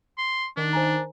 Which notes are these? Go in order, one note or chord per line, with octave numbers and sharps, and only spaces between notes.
C6
D#3 D4
C5 G#5 A#5